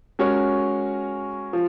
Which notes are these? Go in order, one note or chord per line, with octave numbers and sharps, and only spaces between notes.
G#3 C#4 F#4 A#4 C#5
F3